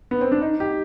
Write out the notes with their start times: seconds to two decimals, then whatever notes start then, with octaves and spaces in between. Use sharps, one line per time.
0.11 B3
0.21 C4
0.32 D4
0.41 D#4
0.60 G4